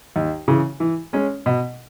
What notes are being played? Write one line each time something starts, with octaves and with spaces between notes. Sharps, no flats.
D#2
C#3 E3
E3
G#3 C#4
B2